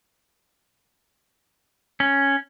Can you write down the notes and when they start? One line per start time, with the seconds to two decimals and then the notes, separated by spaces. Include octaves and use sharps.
2.00 C#4